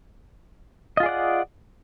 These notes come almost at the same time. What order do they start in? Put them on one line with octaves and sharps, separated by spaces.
D#5 F4 G#4 D5 F#5